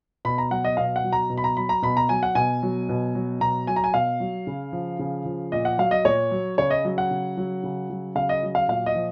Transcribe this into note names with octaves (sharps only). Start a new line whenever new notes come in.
B2 B5
A#5
F#3 F#5
D#5
B2 F5
F#5
F#3
A#5
B2
B5
A#5
F#3 B5
A#5
B2 B5
A#5
F#3 G#5
F#5
B2 G#5
F#3
B2
F#3
B2 A#5
F#3 G#5
A#5
G#5
B2 F5
F#3
C#3
F3
C#3
F3
A#2 D#5
F#5
F#3 F5
D#5
A#2 C#5
F#3
C#3 C#5
D#5
F#3
F#5
C#3
F#3
C#3
F#3
C#3 F5
D#5
F#3
F5
A#2 F5
D#5
F3